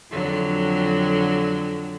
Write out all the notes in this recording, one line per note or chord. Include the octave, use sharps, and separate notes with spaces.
F2 D3 F#3